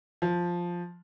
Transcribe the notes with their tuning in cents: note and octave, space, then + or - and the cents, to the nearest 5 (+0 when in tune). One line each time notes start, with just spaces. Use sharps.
F3 +5